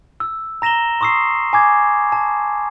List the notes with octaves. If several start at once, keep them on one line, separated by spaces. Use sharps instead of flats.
E6
A#5 A#6 E7 F7 G7
C6 C#6 D#6 E6 C7
G#5 D6 G#6
A5